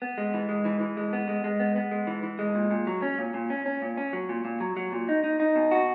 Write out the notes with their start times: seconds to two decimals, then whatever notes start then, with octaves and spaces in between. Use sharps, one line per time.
0.02 B3
0.18 G#3
0.34 E3
0.49 G#3
0.65 E3
0.80 E3
0.97 G#3
1.13 B3
1.29 G#3
1.44 G#3
1.60 B3
1.76 B3
1.91 G#3
2.07 E3
2.23 E3
2.39 G#3
2.55 A#2
2.71 A#2
2.87 F#3
3.02 C#4
3.19 A#2
3.34 A#2
3.50 C#4
3.66 C#4
3.82 A#2
3.97 C#4
4.13 F#3
4.29 A#2
4.45 A#2
4.60 F#3
4.77 F#3
4.92 A#2
5.09 D#4
5.24 D#4
5.40 D#4
5.56 B2
5.71 F#4